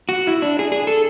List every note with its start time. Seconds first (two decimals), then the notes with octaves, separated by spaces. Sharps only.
0.09 F#4
0.27 E4
0.42 D4
0.59 G#4
0.72 G#4
0.87 A4